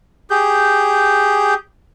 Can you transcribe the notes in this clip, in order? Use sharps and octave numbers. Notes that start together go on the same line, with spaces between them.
G4 G#4 G6